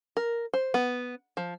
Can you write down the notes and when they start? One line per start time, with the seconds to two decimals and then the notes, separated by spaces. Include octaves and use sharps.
0.17 A#4
0.53 C5
0.74 B3
1.37 F3